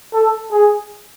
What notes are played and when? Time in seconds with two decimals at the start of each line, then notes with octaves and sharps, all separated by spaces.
0.13 A4
0.52 G#4